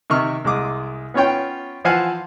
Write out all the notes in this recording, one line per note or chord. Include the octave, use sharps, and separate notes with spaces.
C3 D#3 C#6 F6
C2 G#3 D6 D#6
B3 C#4 F4 C#5 G5
E3 F3 C5 F5 F#5 G#5